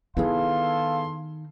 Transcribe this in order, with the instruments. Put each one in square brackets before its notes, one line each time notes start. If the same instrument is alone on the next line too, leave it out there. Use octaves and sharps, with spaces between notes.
[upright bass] D#3 D#4 [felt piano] B3 E4 G#4 [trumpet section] A4 C6 [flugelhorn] F5